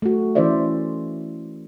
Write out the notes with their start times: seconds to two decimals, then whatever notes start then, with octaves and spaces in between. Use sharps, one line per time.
0.02 A3 F#4
0.35 E3 C#4 E4 C5 D5 E5